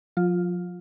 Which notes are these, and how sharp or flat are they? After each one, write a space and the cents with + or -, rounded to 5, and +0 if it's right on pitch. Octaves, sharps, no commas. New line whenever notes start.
F3 +40 F4 +5